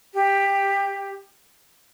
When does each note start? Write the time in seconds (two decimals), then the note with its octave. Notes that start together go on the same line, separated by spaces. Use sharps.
0.14 G4